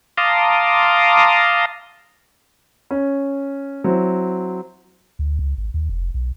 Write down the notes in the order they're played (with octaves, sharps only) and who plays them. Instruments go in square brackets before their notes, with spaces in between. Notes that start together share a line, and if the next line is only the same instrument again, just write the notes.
[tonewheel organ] F5 A5 A#5 C6 D6 D#6
[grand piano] C#4
F#3 C4 E4
[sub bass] D2
C#2
G#1
D#2
F1
B1